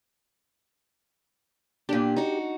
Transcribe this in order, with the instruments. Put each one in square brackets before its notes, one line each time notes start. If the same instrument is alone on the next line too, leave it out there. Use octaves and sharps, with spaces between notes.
[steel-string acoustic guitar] A#2 D4 [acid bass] G4
[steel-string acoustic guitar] D#4 F#4